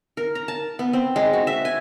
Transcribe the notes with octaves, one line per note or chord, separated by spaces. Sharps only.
A#4
A#5
A5
B3
C4
G#3
F#4
E5
G#5